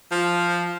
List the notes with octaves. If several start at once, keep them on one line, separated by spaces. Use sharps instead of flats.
F3